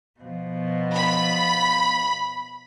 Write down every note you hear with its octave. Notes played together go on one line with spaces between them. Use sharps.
B2 F3
B5